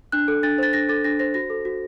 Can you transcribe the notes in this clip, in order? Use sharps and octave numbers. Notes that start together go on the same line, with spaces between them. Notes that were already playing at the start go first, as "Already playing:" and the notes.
D4 F#6
A4
D4 A6
C5 A6
D4 A#6
A4 A6
D4 A#6
C5 A#6
F#4 A#6
A4
F#4